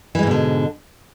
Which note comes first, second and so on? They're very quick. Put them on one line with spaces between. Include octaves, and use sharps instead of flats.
E3 G#3 G#2 B2 D3